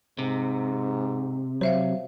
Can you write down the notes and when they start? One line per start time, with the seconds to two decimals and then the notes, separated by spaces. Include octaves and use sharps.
0.19 G#2 C3
1.61 F#3 C5 E5 F5